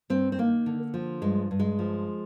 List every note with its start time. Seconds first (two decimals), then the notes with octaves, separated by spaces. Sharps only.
0.10 G2 C4
0.32 C4
0.39 D#3 A#3
0.66 D3
0.94 F3
1.22 G2 G#3
1.51 G2
1.60 G#3
1.79 F3